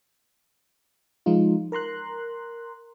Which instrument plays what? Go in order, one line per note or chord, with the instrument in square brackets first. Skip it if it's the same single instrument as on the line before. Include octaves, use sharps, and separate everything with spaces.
[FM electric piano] F3 G#3 D#4 F4
A#4 A#5 C6 F#6